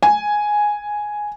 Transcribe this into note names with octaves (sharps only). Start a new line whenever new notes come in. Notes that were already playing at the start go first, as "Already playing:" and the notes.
G#5